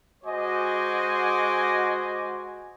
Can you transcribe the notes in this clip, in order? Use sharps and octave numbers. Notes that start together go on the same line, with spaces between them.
G#3 F#4 C5 D#5 G#5 D6